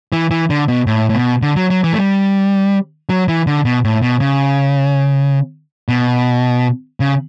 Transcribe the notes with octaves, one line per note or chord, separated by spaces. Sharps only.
E3
E3
D3
B2
A2
A2
B2
D3
F#3
F#3
E3
A3
G3
F#3
E3
D3
B2
A2
B2
C#3
B2
C#3